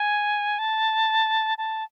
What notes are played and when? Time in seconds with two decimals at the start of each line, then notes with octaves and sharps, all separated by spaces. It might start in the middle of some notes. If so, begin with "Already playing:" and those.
Already playing: G#5
0.59 A5
1.58 A5